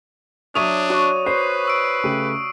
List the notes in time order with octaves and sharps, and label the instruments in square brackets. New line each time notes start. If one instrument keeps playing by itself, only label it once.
[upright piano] F#3 E5 F7 [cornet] D4 [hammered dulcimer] C#5 [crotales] D#6 D#7
[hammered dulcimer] F#4 C#5 D5
[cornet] B4 [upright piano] C5 [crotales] C7
[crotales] C#6 E6 D7
[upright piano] C#3 A3 G4